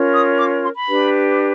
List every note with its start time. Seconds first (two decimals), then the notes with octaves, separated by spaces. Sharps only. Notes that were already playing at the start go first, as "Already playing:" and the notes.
Already playing: C#4 F4 A#4 C#5
0.15 D#6
0.38 D6
0.63 C6
0.76 B5
0.88 D4 G4 B4